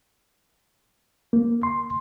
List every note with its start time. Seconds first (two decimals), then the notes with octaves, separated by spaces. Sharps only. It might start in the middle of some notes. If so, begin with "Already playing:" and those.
1.33 A#3
1.63 C6